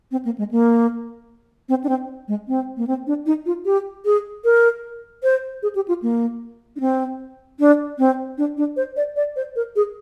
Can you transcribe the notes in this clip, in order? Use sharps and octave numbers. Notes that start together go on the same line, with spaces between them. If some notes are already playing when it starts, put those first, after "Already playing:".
C4
A#3
G#3
A#3
C4
D4
C4
G#3
C4
A#3
C4
D4
D#4
F4
G4
G#4
A#4
C5
G#4
G4
F4
A#3
D4
C4
D4
C4
D4
D4
C5
D5
D5
C5
A#4
G#4